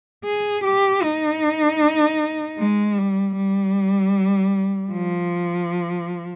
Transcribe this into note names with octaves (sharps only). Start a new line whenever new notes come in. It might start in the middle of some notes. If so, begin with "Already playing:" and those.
G#4
G4
D#4
G#3
G3
G3
F3